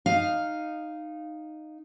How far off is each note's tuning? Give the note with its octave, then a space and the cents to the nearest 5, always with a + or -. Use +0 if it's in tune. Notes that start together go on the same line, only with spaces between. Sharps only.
D#4 -10 F5 +0